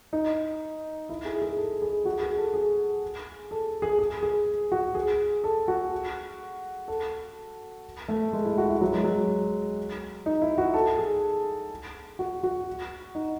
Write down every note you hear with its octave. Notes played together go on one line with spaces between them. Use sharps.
D#4
E4
G#4
G#4
A4
G#4
F#4
G#4
A4
G#4
A4
G#4
G#4
G#4
F#4
G#4
A4
F#4
A4
A3
G#3
E4
F#4
E4
F#3
G#3
F#3
D#4
E4
F#4
A4
G#4
F#4
F#4
D#4